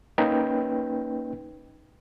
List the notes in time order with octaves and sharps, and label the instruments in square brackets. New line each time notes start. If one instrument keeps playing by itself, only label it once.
[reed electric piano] A#3 C#4 D#4 B4 G5